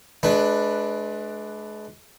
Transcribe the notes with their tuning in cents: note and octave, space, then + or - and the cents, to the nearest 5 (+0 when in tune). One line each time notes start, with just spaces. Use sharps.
G#3 +40 D4 +10 B4 +0